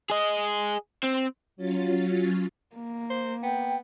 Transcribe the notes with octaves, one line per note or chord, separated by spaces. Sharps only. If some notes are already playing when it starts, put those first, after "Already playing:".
G#4 D#5
C4
F#3 C#4 F4 A6
A#3
C5
B3 G5